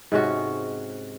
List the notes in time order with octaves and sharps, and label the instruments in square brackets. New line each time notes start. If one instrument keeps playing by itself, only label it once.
[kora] G#2 C3 C#4 F#4